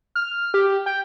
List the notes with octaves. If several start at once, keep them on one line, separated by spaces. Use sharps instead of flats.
F6
G4
G5